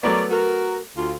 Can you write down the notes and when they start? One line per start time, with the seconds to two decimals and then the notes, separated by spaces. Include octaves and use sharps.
0.03 F#3 A3 B3 A#4 C#5 D5
0.31 F#4 A#4
0.97 D2 F4